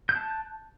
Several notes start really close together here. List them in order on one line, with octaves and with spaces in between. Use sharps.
G6 F#6 A5